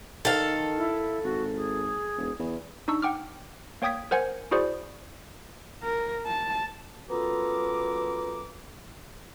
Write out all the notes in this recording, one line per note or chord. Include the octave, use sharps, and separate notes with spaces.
D#3 A4 F5
E4
G#1 F#4
G#4
E1
E2
D4 D#4 C#6 E6
F#5 G5 D6 F6
A#3 C#5 G5 D#6 G#6 B6
A#4 C5 F#5 G#5 G#6
E4 F#4 G#4 C5 D5
A#4
A5
F#2 B3 F4 A4 A#5 D6